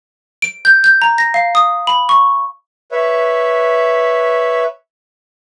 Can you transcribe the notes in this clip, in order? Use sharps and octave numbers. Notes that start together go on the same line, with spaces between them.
D7
G6
G6
A#5
A#6
F5
D#6
B5
C#6
B4 C#5 E5